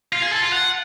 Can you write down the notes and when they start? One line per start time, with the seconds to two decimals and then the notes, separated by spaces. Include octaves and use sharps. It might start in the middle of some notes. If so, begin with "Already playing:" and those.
0.13 F4
0.22 G#4
0.32 A4
0.42 F4
0.52 F#5